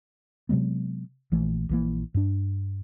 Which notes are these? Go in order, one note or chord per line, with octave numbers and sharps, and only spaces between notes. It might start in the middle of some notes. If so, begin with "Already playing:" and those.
C3 F#3 G#3 B3
A#1 E3 A3
A#1 E3 A#3
G2 D4